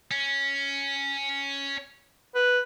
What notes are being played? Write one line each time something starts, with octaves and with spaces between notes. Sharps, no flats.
C#4
B4